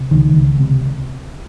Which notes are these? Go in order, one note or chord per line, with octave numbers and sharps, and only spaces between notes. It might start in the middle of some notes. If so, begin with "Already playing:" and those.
Already playing: C3
C#2 D#3
C#2
C3